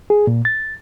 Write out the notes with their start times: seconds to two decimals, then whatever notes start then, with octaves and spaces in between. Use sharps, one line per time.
0.10 G#4
0.27 A#2
0.45 A6